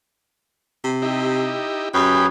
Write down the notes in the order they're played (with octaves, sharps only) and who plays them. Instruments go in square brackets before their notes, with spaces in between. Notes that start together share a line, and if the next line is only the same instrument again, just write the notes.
[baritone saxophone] C3
[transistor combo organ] D#4 E4 G4
[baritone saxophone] F#2 [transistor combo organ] G4 G5 B5 [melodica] G#4 B4 C#5